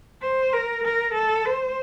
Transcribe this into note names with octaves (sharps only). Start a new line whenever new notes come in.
C5
A#4
A#4
A4
C5